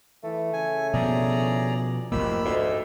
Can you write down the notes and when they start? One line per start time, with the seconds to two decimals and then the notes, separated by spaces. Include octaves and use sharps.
0.24 E3 A3
0.53 C#3 G#5
0.93 B2 F3 B3 G#4 D5 A#5
2.12 F1 E2 D#3 F3 A#3 G4 B5 E6
2.45 D2 G#2 D#5